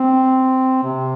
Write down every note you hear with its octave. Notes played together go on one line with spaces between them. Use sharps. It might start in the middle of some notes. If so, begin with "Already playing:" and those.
Already playing: C4
C3